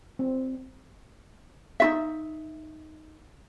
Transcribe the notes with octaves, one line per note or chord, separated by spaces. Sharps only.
C4
D#4 F4 E5